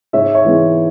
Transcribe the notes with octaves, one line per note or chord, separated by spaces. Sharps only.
G#2 C#5 E5
C#5 E5
E3 G#3 B3